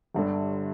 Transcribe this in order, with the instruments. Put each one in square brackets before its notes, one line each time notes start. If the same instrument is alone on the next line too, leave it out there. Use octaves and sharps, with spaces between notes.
[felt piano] G1 G2 D3